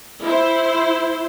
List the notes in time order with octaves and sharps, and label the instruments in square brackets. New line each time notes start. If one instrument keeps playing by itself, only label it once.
[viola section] E4 C5